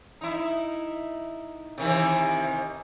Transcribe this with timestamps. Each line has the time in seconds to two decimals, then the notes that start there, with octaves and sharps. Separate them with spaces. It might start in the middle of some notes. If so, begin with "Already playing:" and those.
0.21 D#4 E4
1.78 C3 D#3 E3